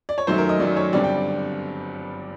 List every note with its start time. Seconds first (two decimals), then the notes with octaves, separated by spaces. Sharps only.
0.09 D5
0.18 C#5
0.27 F#2 D#3 F#3 A3 C5
0.38 A#4
0.49 D#5
0.60 F#2 D#3 F#3 A3 D5
0.77 C#5
0.93 G1 G2 D3 G3 C4 D5
1.04 G5